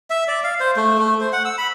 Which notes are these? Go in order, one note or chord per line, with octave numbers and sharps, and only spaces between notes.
E5
D5
F5
C5
A3
A3
C5
F#5
E6
B5